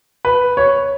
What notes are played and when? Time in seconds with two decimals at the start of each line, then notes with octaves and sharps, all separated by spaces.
0.25 B4
0.57 C#5